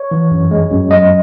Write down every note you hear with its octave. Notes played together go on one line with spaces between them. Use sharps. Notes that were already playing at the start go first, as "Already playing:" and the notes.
Already playing: C#5
E3
F#2
G#3
F#2
F#3 D#5